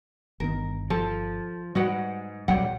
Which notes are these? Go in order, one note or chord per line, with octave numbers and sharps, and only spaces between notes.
G1 D#3 B3 A#4
F3 A4
G#2 G3 F#4 B4 F#5
A#1 F#3 G3 F#5 G5